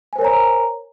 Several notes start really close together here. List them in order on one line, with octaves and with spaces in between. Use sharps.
G#5 C5 A#4 C#5 A#5